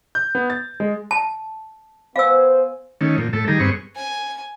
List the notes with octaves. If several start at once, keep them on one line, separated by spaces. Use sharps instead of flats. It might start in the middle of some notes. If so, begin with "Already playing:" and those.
G6
B3
A6
G#3
A5
B3 C5 F5 G#5 E6
D#3 A3 C#4
A#2 F3
A2 A3 A4
D#3 G3 G#4 A#5
G2 B3 C4 G#4 C#6
G#5